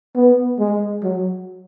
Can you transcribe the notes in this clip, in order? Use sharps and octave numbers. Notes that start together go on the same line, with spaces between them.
B3
G#3
F#3